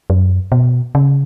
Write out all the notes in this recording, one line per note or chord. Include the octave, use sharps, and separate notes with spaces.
F#2
B2
C#3